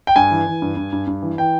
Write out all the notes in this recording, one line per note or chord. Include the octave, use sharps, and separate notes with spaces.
G5
G2 G#5
E3
E3
G2
G2
G2
G2
E3
E3 G5